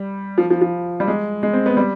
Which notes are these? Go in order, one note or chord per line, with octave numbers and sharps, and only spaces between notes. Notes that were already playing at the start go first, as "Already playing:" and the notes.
Already playing: G3
F3
F3
F3
G3
G#3
G#3
C4
B3
G3